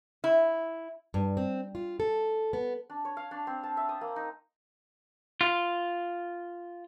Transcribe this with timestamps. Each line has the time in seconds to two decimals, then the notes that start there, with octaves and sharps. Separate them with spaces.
0.24 E4
1.14 G2
1.37 C4
1.75 F4
2.00 A4
2.53 B3
2.90 D4
3.05 C#5
3.17 F5
3.31 D4
3.47 C4
3.63 A5
3.77 E5
3.89 D#6
4.01 A#3
4.16 D#4
5.41 F4